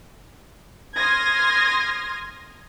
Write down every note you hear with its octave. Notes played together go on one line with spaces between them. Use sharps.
C6 D#6 F6 G#6 A#6